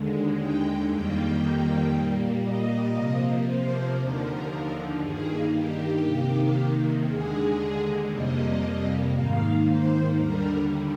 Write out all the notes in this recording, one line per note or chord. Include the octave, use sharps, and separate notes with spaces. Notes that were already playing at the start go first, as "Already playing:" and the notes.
Already playing: D#2 D3 G#3
G5
F2 D#3 G3 A#3 G5
A#2 G3 A#3
D#5
C3 F3 A#3
C5
D#2 D3 F3 A#4
G2 D#3 A#3 G#4
G4
C3 D#3 A#3
D#2 D3 G#3 G#4
F2 C3 G3 A#3 D#5
G#2 D#3 A#3 F5
C5
D#2 D3 G3 A#4